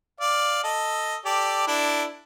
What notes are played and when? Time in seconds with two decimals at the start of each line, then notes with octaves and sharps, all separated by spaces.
0.21 D5 F5
0.64 A4 D#5
1.26 G4 A4 D5
1.67 D4 E4 A4